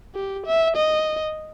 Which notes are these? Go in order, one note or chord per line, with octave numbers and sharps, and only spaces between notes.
G4
E5
D#5